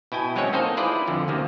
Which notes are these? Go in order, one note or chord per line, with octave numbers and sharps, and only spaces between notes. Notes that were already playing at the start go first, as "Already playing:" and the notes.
B2 E4 G5 G#5
F#3 G#3 C4 C#4 C#5
A#3 C4 D#4 A4 C5 D#5
E4 F4 G#4 B4 D5
F2 D3
D2 C3 A#3